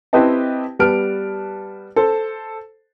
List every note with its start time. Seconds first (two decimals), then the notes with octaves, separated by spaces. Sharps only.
0.13 C4 E4 G4 B4 D#5 A5
0.79 G3 B3 B4 A5 F6 D7
1.96 A4 C5